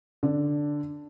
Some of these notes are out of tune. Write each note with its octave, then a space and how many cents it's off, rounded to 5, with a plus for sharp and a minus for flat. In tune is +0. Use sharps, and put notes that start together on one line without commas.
D3 +0 D5 -5